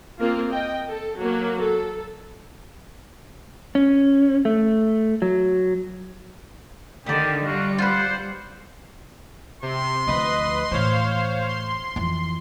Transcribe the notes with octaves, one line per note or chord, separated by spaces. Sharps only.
A#3 C4 F4
D#5 G5
A4
F#3 A#3
A4
C#4
A3
F#3
D3 D#3 D#4 G4 D5
G3 D4 F4 F#4
F4 B4 C5 F#5
C3 C6
D2 F3 B4 D#5
A2 E3 C5 C#5 F5
C6
F2 E3